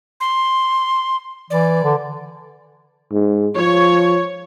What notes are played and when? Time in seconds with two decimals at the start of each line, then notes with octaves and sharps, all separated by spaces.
0.20 C6
1.50 E3 D5
1.84 D3
3.12 G#2
3.56 F3 C#5